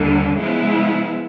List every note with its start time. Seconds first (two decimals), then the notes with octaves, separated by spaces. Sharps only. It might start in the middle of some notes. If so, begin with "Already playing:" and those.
Already playing: D#2 D3 G3
0.36 C#3 F3 G#3 B3 E4